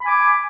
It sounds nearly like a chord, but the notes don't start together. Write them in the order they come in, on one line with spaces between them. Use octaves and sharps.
B5 G#5 D6